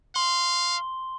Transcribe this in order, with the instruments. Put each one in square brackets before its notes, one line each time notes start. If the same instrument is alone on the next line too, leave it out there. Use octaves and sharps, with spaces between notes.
[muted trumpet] F5 [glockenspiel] C6 G7